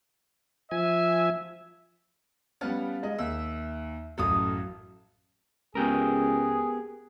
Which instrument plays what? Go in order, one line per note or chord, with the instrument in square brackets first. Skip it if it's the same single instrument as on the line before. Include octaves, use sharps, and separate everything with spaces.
[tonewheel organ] F3 G#5 [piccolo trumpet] E5
[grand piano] G3 B3 C#4 [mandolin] F5 F#5 A5
[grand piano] G#3 D#5
[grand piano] D#2 [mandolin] E5
[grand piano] A1 F#2 F#3 [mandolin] A4 F5 D#6
[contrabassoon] C#2 [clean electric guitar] B3 G4 A#4 [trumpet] G#4